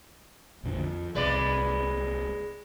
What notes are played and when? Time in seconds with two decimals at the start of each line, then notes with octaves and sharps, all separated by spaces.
0.63 A#1 F2 D3
0.79 F2
1.15 D1 C2 C3 G#3 B4 D5